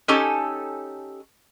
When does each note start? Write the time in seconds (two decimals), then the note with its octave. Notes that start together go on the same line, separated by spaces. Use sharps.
0.08 C#4 D#4 G4 A4 G#5 A5